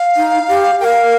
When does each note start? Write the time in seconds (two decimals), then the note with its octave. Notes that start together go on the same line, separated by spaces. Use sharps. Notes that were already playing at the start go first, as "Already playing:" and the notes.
Already playing: F5
0.17 D#4
0.48 G4
0.80 A#4 F5 G5